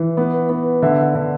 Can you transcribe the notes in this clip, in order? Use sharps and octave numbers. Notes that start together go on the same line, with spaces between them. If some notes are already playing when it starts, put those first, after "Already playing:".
Already playing: E3
B3
B3
D3 E5
D3